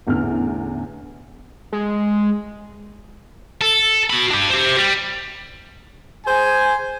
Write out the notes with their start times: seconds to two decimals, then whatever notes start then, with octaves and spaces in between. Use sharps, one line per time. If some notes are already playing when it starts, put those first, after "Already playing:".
0.07 A1 E2 D3 F6
1.72 G#3
3.61 A4
4.10 F#4 B5
4.31 D4 G4
4.50 G4 C5
4.78 G3
6.26 G#4 C5 G#5